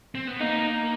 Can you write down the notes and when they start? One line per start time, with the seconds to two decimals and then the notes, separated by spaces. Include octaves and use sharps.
0.15 C4
0.27 B3
0.41 A#3 D#4